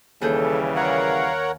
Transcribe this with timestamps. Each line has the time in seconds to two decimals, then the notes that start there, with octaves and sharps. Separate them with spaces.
0.21 D#2 C#3 E3 G3 G#4 A4 G6
0.76 A#4 C#5 F5 F#5